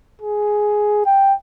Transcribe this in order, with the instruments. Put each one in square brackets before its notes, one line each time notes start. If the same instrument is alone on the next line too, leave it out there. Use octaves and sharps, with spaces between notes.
[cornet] G#4
G5